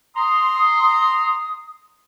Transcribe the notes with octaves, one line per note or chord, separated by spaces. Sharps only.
A#5 C6 D#6